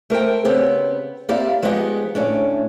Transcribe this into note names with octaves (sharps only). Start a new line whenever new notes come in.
A3 A#4 C5 G5
C#3 B3 C4 G4
A#3 C4 E4 G4 D5 F5
F3 G#3 B3 D#4 F#4 G4
D2 A2 C#4 D4